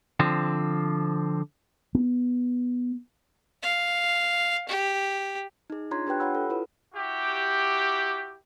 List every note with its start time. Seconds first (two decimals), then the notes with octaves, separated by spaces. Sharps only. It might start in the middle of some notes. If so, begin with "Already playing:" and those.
0.20 D3 F3 C4
1.95 B3
3.63 F5
4.68 G4
5.70 D#4 G#4
5.91 D4 F4 C#5 A#5 C6 G#6
6.07 D4 G4 B4 G5 F#6
6.20 F4 G4 C#5 F#5 B5 E6
6.35 A4
6.50 E4 F4 A4 B4
6.95 E4 F#4 G4